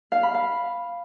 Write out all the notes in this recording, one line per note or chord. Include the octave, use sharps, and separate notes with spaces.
F5
B5
F5